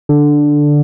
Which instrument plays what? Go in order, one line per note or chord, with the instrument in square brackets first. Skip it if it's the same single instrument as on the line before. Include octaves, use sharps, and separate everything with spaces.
[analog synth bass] D3